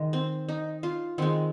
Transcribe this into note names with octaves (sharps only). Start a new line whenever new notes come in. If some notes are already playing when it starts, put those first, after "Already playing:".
Already playing: D#3 G#3 D#5
C4
D#4
F4
D#3 G#3 C4